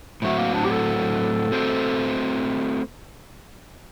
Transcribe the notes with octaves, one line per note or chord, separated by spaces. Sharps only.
A2 F#3 A3 C4 F#4
A#3
D4
G4
A4
A3 C4 F#4 C5